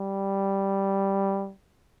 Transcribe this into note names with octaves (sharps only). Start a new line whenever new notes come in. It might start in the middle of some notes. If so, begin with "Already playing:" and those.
Already playing: G3